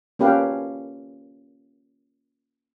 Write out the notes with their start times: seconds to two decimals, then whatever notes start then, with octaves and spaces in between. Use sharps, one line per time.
0.19 A#3 C#4 G4 B4 F5